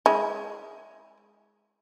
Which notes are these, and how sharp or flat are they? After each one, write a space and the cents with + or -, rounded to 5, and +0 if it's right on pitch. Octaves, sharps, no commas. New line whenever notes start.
G#3 +0 E4 -25